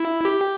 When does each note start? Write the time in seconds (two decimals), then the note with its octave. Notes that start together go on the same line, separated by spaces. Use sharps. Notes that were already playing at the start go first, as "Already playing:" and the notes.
Already playing: E4
0.25 G4